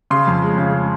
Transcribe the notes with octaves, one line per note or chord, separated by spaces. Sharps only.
C#3 C6
F2
G#3
C#3
G#3